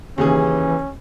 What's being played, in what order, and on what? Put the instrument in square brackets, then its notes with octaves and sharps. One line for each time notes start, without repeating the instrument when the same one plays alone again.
[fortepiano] D#2 C#3 G#4 [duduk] E3 [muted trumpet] C#4